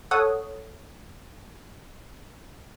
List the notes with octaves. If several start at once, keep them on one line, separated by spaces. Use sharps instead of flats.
A4 C#5 F#5 D#6